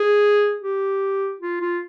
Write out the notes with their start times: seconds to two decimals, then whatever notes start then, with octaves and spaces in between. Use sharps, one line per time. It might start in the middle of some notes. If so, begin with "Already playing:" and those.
Already playing: G#4
0.62 G4
1.40 F4
1.61 F4